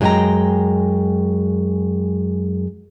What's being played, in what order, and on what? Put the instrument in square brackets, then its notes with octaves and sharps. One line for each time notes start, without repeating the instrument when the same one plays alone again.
[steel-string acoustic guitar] F#2 G#3 E4 G4 G5 A#5